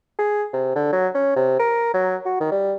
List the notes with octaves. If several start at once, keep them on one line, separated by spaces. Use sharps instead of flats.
G#4
C3
D3
F#3
C#4
C3
A#4
F#3
F#4
D#3
G3